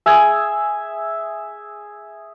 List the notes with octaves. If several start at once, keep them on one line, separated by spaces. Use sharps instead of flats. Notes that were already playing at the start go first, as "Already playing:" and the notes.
G#4 E5 G#5